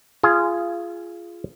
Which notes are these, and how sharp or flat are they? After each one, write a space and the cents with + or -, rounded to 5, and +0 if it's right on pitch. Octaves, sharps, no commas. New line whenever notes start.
F4 -20 G#4 +0